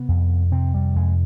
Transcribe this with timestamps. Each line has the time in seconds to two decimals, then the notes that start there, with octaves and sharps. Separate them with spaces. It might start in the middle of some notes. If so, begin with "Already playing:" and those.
Already playing: C3 B3
0.08 F2
0.51 C3 C4
0.74 G3
0.95 F2 G#3